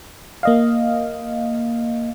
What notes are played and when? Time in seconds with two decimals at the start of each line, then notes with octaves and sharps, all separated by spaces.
0.43 A#3 D#5 F5